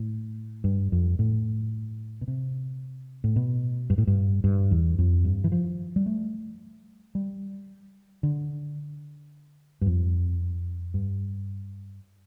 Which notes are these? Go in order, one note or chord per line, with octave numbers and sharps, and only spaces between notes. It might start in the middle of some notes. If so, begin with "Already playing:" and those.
Already playing: A2
G2
F2
A2
B2
C3
A2
B2
G2
A2
G2
G2
E2
F2
G2
E3
F3
G3
A3
G3
D3
G2
F2
G2